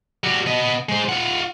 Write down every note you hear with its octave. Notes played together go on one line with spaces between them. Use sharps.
G3 F#4
B3 D#5
G#3 C5
F4 F#5